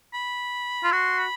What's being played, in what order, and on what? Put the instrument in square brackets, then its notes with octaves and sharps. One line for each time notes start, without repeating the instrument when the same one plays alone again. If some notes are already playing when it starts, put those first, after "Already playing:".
[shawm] B5
[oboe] F4
[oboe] F#4 [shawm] C6
[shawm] B5